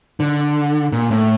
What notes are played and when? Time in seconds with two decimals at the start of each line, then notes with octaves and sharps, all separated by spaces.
0.20 D3
0.93 A#2
1.11 A2